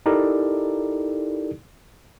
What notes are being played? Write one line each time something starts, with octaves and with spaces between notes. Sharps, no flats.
D#4 E4 G4 A4 A#4 D5